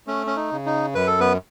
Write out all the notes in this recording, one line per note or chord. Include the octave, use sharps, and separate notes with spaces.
A3 C#4
C#4
D#4
C#3
D#4
F#2 B4
A4
B3 B4